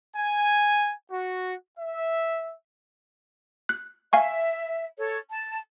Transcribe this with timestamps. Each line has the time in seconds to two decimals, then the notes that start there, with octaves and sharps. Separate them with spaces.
0.17 G#5
1.11 F#4
1.79 E5
3.69 F#6
4.13 E5 F5 G#5 C#6
4.98 A4 C#5
5.30 A5